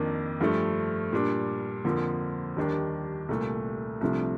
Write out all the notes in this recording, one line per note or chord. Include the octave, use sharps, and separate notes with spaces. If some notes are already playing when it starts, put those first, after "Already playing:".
Already playing: F2 D#3 A#3 D4
G2 F3 A3
A#2 G3 D4
F2 D3 F3 A#3
D#2 D#3 G3 D4
C2 A#2 A3
C2 C3 F3 A3 D4